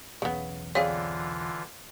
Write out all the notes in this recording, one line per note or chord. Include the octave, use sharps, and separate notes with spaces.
B1 E2 C#3 B3
D3 E3 C4 F4 G#4 C#5 D5 F5